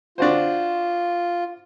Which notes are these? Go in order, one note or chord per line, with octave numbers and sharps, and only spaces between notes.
D4 F4 F#4 C5